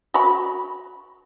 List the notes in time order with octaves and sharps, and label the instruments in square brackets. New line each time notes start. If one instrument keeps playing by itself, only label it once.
[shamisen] F#4 B5